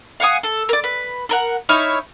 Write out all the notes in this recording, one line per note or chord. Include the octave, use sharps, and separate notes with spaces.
F5 F#5 G#5 D#6
A4
A#4 D5
B4
A4 A#4 F#5
D#4 E4 C#5 F6